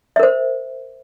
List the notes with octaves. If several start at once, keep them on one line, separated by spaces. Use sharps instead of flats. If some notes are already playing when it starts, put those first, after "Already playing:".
A#4 C5 E5